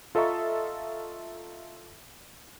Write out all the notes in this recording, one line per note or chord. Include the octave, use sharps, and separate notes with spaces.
F4 A4 D#5 E5 A#5 C#6